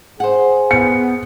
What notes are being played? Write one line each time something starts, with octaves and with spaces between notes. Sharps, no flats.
G#4 C5 F#5
B3 C#7